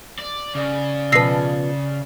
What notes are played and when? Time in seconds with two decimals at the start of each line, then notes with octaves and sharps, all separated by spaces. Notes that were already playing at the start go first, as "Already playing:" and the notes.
0.19 D5
0.55 C#3 D5
1.12 B2 F3 B4 E6 A#6 C7